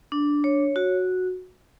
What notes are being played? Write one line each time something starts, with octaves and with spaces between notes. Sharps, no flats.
D4
C#5
F#4